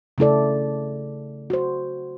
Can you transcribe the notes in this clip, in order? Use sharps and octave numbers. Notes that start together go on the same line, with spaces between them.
C#3 A3 E4 A4 D5
F#4 C5